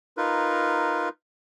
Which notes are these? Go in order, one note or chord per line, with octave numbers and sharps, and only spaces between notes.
D#4 F4 A#4 B4